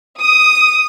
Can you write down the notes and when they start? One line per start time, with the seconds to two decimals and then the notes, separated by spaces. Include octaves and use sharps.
0.21 D#6